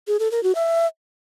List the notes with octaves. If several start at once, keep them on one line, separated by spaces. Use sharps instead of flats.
G#4
A4
A#4
F#4
E5